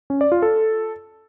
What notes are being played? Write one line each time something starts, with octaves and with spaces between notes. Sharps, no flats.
C#4
D5
F4
A4